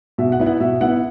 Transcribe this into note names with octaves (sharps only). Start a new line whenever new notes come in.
B2 E5
F#5
B3 E4
F#5
B2 E5
B3 E4 F#5